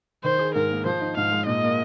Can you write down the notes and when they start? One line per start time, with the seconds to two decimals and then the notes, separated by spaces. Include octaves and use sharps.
0.24 D#3 C5
0.39 G#4
0.54 G#2 A#4
0.71 A#3
0.85 F3 C5
1.01 D#4
1.17 G#2 F5
1.32 G#3
1.46 A#2 D#5
1.63 A#3